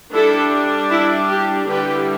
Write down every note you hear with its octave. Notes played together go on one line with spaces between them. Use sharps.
G3 D4 E4 A4
E4
G4
D3 G3 E4 G4 B4